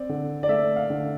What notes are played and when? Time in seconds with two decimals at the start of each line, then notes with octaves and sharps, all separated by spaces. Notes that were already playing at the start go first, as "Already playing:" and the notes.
Already playing: C4 D5
0.09 D3
0.43 D5
0.49 A3 E5
0.76 F5
0.90 D3